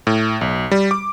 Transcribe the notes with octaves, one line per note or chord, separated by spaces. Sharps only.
A2
B1
G3
D6